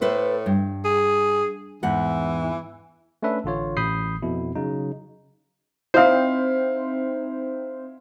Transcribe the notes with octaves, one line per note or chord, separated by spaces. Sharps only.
A2 A4 B4 C5
G2
G#4
E2 G#2 E3 F#5
A3 C#4 D4 B4 E5
A1 D3 F4 C#5
A1 A2 B5 D#6 G6 C7
F2 B2 E4
C#3 F#3 D#4
C4 D#4 E4 C5 F5